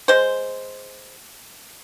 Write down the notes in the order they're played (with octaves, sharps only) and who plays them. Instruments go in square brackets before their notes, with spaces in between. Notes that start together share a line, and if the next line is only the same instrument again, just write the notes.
[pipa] G#3 C5